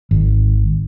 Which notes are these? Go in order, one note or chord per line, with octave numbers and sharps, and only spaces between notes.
G#1